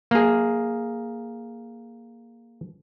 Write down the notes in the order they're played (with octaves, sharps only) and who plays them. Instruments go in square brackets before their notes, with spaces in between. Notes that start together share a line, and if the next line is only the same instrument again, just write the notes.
[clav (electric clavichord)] A#3 G#4